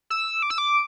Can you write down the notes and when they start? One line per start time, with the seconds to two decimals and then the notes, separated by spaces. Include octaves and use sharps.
0.10 E6
0.43 D6
0.50 E6
0.58 D6